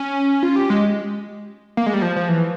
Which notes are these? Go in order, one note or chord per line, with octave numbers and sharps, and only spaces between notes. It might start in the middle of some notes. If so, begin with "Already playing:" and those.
Already playing: C#4
F4
G4
G#3
A#3
G#3
G3
F3
F3
E3